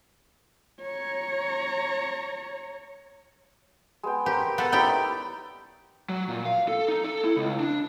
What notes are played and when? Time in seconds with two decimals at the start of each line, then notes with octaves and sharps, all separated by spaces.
0.82 C#5 A#5
4.03 G#3 B3 G5
4.26 G4 A#4 C5
4.58 B3 A4
4.72 D#4 E4 G4 C#5 D5 G5
6.09 F#3
6.29 A#2
6.45 F5
6.68 A4
6.88 D#4
7.04 A4
7.24 E4
7.37 C#2
7.60 D4